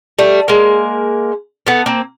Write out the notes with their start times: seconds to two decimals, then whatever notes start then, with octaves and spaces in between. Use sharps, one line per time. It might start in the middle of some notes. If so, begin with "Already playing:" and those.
0.19 G3 A3
0.48 G#3 A#3
1.67 A3 B3
1.86 A#3 C4